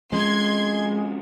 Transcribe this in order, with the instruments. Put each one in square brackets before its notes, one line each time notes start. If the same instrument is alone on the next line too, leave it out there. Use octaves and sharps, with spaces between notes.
[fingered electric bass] F3 C4 C#4 [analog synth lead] G#3 [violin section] C6 G#6